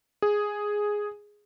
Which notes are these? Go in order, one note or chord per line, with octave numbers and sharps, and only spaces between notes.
G#4